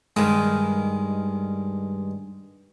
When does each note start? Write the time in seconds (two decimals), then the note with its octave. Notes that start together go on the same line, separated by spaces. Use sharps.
0.16 G2 D#3 G#3